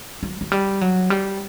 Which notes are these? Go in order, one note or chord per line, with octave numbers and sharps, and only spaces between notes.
F#3
F#3
G3
F#3
G3